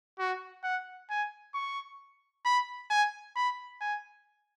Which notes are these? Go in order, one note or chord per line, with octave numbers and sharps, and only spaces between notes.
F#4
F#5
G#5
C#6
B5
G#5
B5
G#5